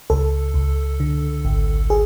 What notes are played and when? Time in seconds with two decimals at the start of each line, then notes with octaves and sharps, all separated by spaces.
0.10 C#2 A4
0.54 C#2
1.00 D3
1.45 G#1
1.90 G#4